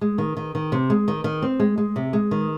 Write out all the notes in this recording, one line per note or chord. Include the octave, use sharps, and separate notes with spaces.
G#3
D#3
D#3
D#3
C3
G#3
D#3
D#3
C4
G#3
G#3
C3
G#3
D#3